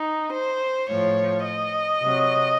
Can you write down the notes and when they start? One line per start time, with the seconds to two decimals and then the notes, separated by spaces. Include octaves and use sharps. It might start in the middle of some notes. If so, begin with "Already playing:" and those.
Already playing: D#4
0.34 C5
0.89 A2 F3 C#5
1.44 D#5
2.00 C3 F#3